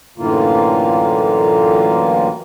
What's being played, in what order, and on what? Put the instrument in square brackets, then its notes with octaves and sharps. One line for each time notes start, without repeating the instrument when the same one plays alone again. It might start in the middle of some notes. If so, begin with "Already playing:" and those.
[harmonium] F#2 A2 D3 E3 A#3 F4